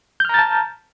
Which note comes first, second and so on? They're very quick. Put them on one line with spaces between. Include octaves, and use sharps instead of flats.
G6 F6 A#5 A6 A5